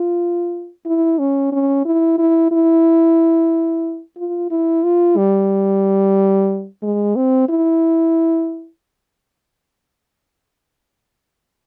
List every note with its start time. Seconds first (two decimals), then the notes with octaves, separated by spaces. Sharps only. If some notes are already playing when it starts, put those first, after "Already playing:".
Already playing: F4
0.86 E4
1.19 C#4
1.52 C#4
1.85 E4
2.18 E4
2.51 E4
4.17 F4
4.51 E4
4.84 F4
5.17 G3
6.83 G#3
7.16 C4
7.49 E4